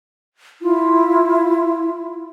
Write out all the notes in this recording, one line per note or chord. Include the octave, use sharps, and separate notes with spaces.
E4 F4